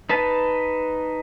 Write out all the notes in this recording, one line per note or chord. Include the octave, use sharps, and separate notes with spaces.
D#4 B4 A5